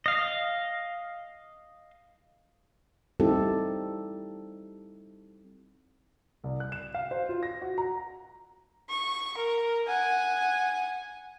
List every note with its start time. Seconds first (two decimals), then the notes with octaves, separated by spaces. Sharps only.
0.06 D#5 F5
3.20 G3 C4 D#4 E4 G4 A4
6.44 C2
6.60 F#6
6.72 E7
6.95 F5
7.11 C5
7.29 F4
7.43 A#6
7.62 F#4
7.78 A#5
8.90 C#6
9.37 A#4
9.87 F#5 G#5